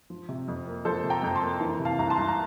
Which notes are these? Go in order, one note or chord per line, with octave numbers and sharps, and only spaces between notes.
F3
C3
F2
A#3
F3 A4 C5
C3
G5 A#5
F2
A5 C6
A#3
E3
C3
F5 A5
C2 A#5
A5 C6
C2
A#5